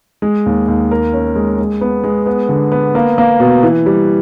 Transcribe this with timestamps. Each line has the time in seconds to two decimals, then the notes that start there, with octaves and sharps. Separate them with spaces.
0.22 G#3
0.46 D#2
0.68 D#2
0.91 A#4
1.13 C#4
1.36 G#3
1.59 G#3
1.81 B3
2.04 G#3
2.26 B3
2.49 D3
2.72 B3
2.95 A#3
3.18 A#3
3.40 B2
3.63 E3
3.86 G3